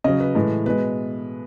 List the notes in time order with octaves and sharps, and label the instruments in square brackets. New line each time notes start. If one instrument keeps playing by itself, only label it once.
[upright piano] C#3 F#3 D#5
B4
A2 E3 G#3
B2 G#3 B4